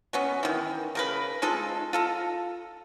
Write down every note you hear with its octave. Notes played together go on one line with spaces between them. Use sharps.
F#3 B3 C#4
D#3 E3
C#3 A#4 B4
G#3 D#4 F4 A4
F4 A4 A#5